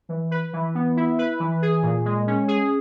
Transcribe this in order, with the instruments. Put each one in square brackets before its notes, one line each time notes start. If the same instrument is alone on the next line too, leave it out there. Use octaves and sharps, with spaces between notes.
[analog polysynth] E3
B4
E3
B3
E4
B4
E3
G#4
A#2
G#3
C#4
G#4